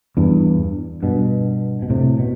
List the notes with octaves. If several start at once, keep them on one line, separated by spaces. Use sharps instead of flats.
E2 G2
G2 B2
B2
A2 C3
B2